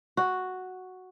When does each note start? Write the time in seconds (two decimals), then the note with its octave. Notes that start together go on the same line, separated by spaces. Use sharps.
0.17 F#4